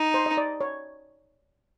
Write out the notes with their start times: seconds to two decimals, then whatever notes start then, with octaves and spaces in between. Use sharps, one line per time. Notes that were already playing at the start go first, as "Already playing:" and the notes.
Already playing: D#4
0.14 C5
0.26 D#5
0.37 D5
0.61 C#5